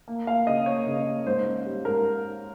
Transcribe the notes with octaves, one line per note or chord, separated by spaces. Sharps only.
A#3
A#3 F5
C#3 D#5
A#3 C#5
C#3
A#3
G#2 C5
C#4
G3
G#2 A#4